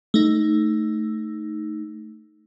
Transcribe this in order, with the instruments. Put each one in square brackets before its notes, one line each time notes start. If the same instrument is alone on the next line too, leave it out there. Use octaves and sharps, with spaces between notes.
[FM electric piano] A3 D#4